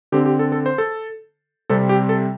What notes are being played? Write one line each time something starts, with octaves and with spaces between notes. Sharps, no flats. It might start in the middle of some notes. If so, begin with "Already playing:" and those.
D3 C4 G4
G4
A4
A4
C5
A4
C3 G3 C4 A4
G4
A4